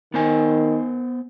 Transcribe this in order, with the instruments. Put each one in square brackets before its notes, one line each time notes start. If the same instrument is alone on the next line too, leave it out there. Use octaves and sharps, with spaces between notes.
[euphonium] D#3 [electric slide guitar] B3 C5 G#5